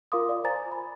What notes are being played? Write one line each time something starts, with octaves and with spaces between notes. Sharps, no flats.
F4 A#4 F5 C6 D6 D#6
D5 F5
C5 G#5 A#5 A6
B5